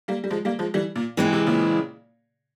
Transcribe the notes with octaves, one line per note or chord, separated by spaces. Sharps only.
G3 A#3
G3
F3 G#3
G3 A#3
F3 G#3
E3 G3
A#2
A#2 E3 G#3 C4 E4
C3
A#2 C#3